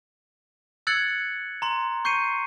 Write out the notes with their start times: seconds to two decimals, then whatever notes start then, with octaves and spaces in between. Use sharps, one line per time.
0.87 E6 F#6 G#6 A6 C#7 F#7
1.62 A#5 C6
2.05 C#6 G6 C7 C#7 D#7